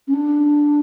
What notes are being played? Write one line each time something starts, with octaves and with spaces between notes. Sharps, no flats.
C#4
D4